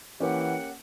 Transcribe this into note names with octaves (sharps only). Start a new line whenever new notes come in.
E3 A#3 C#4 G4 F#5